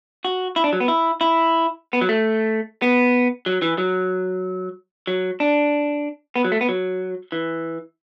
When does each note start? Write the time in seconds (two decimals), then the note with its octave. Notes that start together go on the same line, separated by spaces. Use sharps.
0.25 F#4
0.56 E4
0.64 D4
0.73 F#3
0.80 B3
0.88 E4
1.21 E4
1.93 B3
2.01 F#3
2.09 A3
2.82 B3
3.46 F#3
3.62 E3
3.78 F#3
5.07 F#3
5.40 D4
6.36 B3
6.44 F#3
6.52 A3
6.61 B3
6.69 F#3
7.32 E3